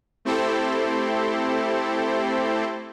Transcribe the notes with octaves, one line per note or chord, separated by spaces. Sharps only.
A3 C4 E4 G4 A4 C5